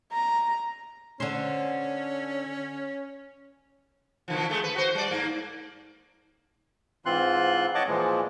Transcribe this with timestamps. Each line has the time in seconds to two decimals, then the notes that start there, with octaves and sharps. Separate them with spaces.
0.12 A#5
1.20 D3 C#4 C5
4.28 B2 D3 F3
4.50 G#3 A3
4.63 B4
4.76 F#4 C5
4.95 G3 D5
5.11 G#2 A#3
7.06 G#2 E3 C4 F4 C6 F#6
7.75 C#5 D#5 F#5 A5 C#6 D6
7.88 A#2 E3 F3 G#3